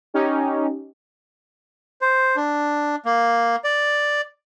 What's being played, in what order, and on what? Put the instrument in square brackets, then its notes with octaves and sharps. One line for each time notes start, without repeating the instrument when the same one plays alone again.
[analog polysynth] C#4 D#4 G4
[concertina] C5
D4
A#3
D5